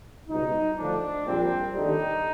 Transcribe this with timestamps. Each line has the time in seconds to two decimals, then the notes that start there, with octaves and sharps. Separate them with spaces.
0.29 C#2 B2 G3 D#4
0.78 D2 D3 F3 D4
1.26 A#1 A#2 G3 C4
1.74 D#2 D3 G3 D#4